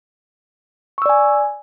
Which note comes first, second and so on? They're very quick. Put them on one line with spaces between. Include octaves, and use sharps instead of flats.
C#6 E6 D5 G#5